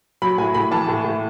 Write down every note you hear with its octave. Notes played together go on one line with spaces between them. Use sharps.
F#3 B5
A2 G#5
A2 B5
E3 A5
A2
A2